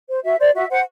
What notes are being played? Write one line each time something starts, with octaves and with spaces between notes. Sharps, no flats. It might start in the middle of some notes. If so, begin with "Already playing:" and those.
C5
F#4 E5
C5 D5
F#4 E5
C5 F#5